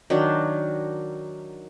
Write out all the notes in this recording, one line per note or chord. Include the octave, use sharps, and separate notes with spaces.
D#3 F#3 D4